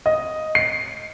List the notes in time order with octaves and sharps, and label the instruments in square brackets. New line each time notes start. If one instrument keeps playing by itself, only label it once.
[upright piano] D#5
C7